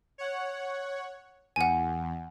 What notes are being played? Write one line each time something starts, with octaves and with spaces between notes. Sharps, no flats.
C#5 F#5
E2 F#5 G#5